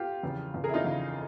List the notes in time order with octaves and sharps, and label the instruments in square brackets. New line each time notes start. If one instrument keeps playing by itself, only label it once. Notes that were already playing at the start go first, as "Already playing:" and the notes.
Already playing: [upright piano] F4 G4
E2 C#3 F3
E2 C#3 F3
G#4 A#4
E4
D#4 F4
E2 C#3 F3